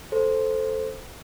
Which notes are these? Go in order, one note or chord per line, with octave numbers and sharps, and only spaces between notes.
A4 C5